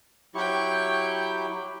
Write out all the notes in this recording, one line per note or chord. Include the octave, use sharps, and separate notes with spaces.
F#3 E4 G4 G5 C#6